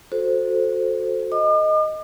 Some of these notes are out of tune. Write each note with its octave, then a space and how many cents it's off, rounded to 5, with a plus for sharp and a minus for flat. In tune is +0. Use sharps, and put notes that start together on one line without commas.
F#4 -20 A4 +0 C5 +0
D#5 +0 D6 +45